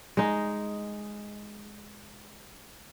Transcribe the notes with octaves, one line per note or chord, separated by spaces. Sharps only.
G#3 D#4